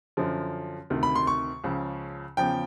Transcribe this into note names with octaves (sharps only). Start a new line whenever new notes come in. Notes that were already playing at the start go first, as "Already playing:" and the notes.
F#2 D3 F3
D2 C3 D#3
B5
C6
C#6
C#2 C#3 F3
E2 C#3 F3 G5